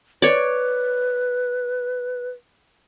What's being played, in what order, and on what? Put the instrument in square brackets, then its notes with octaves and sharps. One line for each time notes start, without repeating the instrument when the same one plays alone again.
[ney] B4 [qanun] C#5 D5